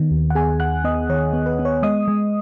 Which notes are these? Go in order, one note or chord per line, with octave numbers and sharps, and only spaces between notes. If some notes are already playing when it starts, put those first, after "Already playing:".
Already playing: D#3 B3
D#2
F#5
B3 G#4 G#5
D#2 F#5 F#6
B3 D#5 D#6
D#3 C#5
B3
B4
B3
C#5
G#3 D#5 D#6
G#3